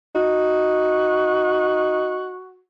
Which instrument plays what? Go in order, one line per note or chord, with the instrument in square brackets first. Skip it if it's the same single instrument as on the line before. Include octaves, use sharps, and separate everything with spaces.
[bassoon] D#4 [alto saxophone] F#4